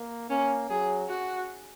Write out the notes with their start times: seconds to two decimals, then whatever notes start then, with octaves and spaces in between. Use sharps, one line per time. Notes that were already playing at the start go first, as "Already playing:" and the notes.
Already playing: A#3
0.30 A#3 C#4
0.70 F#3 G#4
1.09 F#4